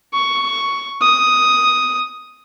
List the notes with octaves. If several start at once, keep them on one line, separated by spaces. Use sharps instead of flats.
C#6
D#6